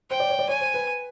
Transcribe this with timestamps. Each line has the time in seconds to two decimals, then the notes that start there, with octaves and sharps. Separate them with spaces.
0.10 C5 G5
0.20 D5
0.30 C#5
0.39 D5
0.49 C#5 G#5
0.61 C5
0.74 B4